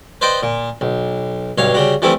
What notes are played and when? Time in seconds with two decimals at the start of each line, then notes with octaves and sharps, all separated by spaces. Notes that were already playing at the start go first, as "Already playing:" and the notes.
0.21 B4 C5 D5 D#5 G5
0.43 A#2
0.81 B1
1.58 B1 G2 C#5 F5
1.74 C#3 G3 F#4
2.02 E3 F3 G3 A3 C4 E4